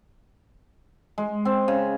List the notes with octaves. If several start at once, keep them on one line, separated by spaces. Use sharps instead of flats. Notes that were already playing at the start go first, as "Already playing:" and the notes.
G#3
C4
C#3